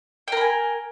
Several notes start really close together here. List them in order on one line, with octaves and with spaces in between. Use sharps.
G5 A#4 B5 G#5